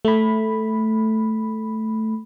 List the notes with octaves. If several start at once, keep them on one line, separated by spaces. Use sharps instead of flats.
A3 B5